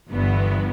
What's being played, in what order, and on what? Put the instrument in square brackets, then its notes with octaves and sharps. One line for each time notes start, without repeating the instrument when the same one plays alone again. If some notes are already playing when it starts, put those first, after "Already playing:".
[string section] G1 G2 E3 B3